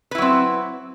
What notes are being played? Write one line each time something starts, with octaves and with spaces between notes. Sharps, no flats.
F#3 C4 E4 B4